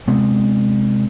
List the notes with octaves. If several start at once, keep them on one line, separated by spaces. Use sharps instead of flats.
C3 G#3 B3 C4